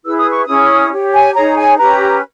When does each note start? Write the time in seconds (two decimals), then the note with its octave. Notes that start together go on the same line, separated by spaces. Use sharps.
0.05 E4 G#4 B4 E6
0.18 D#6
0.31 C#6
0.45 C#4 E4 G#4 C#5 D#6
0.92 G4 C#5
1.14 G#5
1.34 D#4 G#4 C#5 A#5
1.57 G#5
1.78 C#4 G4 B4 A#5